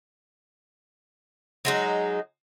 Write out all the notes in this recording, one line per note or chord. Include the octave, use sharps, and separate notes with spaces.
F#3 G#3 D#4